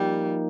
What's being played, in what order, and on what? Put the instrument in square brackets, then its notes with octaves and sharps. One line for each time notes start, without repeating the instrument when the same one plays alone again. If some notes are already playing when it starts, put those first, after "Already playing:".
Already playing: [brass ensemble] F3 A#3 D#4 [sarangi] G3